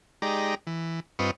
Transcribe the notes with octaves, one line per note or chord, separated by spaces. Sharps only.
G#3 D#4 G4 D5 A#5
E3
G2 C4 F4 B4 D#5 C#6